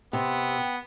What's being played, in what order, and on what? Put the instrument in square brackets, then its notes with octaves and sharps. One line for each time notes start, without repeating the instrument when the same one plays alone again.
[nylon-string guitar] C3 [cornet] B3 [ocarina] G5